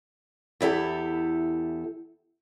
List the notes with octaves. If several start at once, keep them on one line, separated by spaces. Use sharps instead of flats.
E2 E4 G4 A4